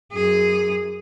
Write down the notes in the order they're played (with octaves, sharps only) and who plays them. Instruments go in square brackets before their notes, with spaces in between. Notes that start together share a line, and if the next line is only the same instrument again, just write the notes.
[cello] F#2 G#4